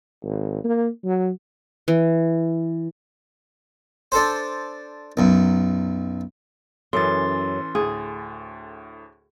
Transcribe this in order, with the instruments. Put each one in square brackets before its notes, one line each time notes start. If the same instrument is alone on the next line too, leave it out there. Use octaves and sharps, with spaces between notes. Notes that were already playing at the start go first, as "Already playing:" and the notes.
[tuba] G#1
A#3
F#3
[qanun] E3
[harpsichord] D4 A4 C5
B1 F#2
[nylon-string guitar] F#2 [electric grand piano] E3 C#4 A4 [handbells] C6 A6
[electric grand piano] D2 A2 [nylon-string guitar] G#4